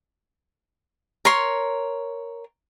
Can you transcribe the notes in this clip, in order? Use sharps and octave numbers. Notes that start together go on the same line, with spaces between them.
A#4 C#5 C6